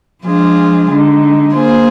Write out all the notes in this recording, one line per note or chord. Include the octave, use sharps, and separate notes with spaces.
F3 G#3 D4 F4 G#4
D3 G#3 D#4
A#3 F4 G#4 C5